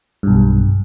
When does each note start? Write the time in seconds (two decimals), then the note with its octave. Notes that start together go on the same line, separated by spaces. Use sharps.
0.23 B1 G2